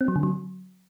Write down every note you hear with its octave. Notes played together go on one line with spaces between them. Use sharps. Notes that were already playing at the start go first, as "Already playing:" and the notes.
C4
F#3
D3
F#3